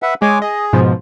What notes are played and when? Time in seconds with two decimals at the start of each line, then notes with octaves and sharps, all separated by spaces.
0.02 B4 E5 F#5
0.22 G#3 C#5 G#5 D6
0.42 G#4 D#5
0.73 G#2 B2 F3